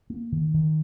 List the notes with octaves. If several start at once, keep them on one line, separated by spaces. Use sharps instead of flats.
A#3
D#3
D#3